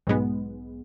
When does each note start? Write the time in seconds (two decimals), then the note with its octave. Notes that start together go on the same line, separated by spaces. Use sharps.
0.07 B1 G#2 G#3 B3